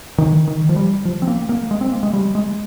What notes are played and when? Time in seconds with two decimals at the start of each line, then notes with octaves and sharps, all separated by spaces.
0.18 D#3
0.47 D#3
0.69 F3
0.76 G3
1.05 F3
1.22 C4
1.27 A#3
1.49 A#3
1.71 G#3
1.81 C4
1.92 A#3
2.03 G#3
2.13 G3
2.35 G#3